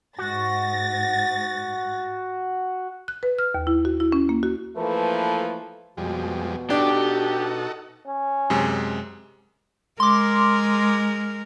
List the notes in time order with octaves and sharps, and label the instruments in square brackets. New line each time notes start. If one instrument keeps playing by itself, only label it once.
[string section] G#2 A6 A#6 [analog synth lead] F#4
[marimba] F#6
B4
F6
D#2
E4
F#4
E4
C#4
A#3
F#4
[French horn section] E3 F3 A3 A#3 A4 B4
[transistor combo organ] F2 G3 G#3 [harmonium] B2
[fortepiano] D4 [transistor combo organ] D#4 F#4 A4 [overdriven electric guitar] G4
[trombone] C#4
[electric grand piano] F#2 C3 G#3
[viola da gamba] G#3 A#4 [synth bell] C6 D6